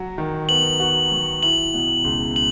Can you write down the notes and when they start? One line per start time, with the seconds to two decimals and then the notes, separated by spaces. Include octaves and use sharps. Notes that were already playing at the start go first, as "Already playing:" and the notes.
Already playing: F#3 F#4
0.18 D#3
0.49 B3 F#7
0.80 F#4
1.12 F#3
1.43 E4 F#7
1.74 B2
2.04 C#2
2.36 F#7